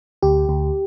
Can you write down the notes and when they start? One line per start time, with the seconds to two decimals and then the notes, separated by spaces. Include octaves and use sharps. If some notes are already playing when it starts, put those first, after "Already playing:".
0.23 D2 G4
0.49 D2